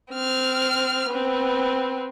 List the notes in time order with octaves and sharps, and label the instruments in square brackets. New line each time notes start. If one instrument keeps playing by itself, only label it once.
[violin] C4 F6
B3 C4